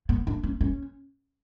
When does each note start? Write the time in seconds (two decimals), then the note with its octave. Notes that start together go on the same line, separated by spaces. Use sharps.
0.09 B3
0.27 D4
0.43 C#4
0.61 C#4